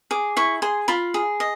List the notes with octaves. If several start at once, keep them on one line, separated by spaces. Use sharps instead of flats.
G#4 D6
E4 C#6
G#4 C6
F4 B5
G#4
D#5